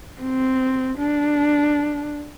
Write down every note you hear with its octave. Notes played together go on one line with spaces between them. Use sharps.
C4
D4